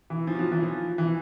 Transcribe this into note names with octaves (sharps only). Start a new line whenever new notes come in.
E3
F3
F#3
F3
E3
F3
E3